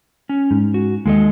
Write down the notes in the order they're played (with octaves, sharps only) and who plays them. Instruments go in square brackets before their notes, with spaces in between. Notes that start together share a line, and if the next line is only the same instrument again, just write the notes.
[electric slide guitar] C#4
[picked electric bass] G#2
[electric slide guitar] F#4
[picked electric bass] D#2 [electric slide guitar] G#3 A4 D#5